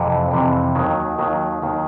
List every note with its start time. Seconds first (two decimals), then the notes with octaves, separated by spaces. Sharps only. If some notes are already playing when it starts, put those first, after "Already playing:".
Already playing: F2 C3 E3
0.31 F2 C3 E3
0.75 D#2 D#3 F#3
1.19 D#2 D#3 F#3
1.62 D#2 D#3 F#3